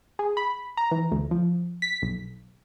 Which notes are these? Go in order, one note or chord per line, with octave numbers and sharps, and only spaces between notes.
G#4
B5
A#5
E3
D2
F3
B6
B1